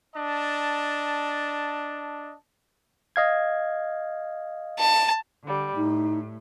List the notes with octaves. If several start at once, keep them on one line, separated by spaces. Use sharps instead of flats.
D4 D#5 A5
D#5 F5 G#6
A5
D3 G3
A2 D#4